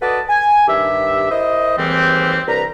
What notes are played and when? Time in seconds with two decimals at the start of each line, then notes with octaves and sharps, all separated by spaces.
0.02 F#4 A4 B4 D5 D#5 A5
0.29 G#5
0.68 G2 D#3 G4 E5
1.31 E4 A#4 C5 D#5
1.78 D#2 G#2 E3 G3 C4
2.48 C2 D4 B4 A#5